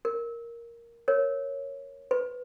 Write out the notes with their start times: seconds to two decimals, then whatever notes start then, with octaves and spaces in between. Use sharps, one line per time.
0.05 A#4
1.08 A#4 C#5
2.11 B4